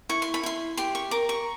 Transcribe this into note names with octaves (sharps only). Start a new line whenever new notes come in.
E4 C#6
C6
B5
E4 C6
G4 C6
C#6
A#4 D6
C#6